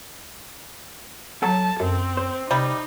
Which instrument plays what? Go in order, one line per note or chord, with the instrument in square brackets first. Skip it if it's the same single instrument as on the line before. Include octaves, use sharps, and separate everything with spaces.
[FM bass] F#3 [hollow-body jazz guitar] A4 [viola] A5
[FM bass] F#2 [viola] C4
[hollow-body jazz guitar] C5
[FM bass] C3 [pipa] G3 [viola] D#4